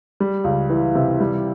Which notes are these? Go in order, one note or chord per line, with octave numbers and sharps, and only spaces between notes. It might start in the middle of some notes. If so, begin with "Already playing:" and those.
G3
C#2
E3
C3
G3